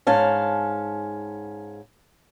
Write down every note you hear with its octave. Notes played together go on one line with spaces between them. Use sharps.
G#2 C#4 F5 A5